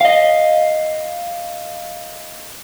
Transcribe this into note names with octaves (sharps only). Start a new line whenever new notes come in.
D#5 F5